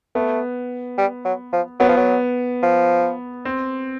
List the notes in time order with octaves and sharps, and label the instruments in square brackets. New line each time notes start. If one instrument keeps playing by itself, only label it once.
[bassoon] A3 [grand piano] B3
[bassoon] G3
F#3
F3
[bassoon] F#3 [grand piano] B3
[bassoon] F3
F#3
F3
[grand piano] C4